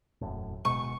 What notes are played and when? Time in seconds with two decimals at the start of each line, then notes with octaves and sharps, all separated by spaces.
0.21 E1 F#2 A2
0.65 D1 B2 G#3 C#6